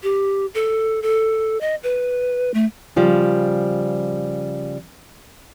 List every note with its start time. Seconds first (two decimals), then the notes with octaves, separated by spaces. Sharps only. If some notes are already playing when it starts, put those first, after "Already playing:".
0.03 G4
0.54 A4
1.02 A4
1.61 D#5
1.83 B4
2.54 A3
2.96 C#3 F3 G3